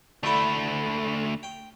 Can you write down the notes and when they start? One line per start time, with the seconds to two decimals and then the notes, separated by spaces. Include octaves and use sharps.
0.23 D2 D3 A3 E4
1.43 G5